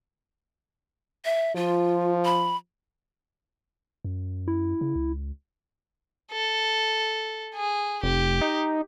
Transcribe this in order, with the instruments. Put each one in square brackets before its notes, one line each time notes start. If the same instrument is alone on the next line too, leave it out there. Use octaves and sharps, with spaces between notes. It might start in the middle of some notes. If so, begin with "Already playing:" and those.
[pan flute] E5
[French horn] F3 [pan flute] F4
[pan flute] B5
[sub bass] F#2
[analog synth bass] E4
[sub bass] C#3
C#2
[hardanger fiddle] A4
G#4
[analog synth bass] F1 [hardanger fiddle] G4
[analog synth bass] D#4